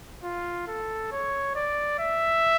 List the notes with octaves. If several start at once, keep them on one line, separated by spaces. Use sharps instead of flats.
F4
A4
C#5
D5
E5